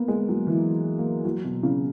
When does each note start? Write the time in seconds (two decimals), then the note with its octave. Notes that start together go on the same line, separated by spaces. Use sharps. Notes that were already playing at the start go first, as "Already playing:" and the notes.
Already playing: A#3 B3
0.08 G#3
0.29 F#3
0.47 E3
0.98 A#3
1.25 F#3
1.44 B2
1.63 C#3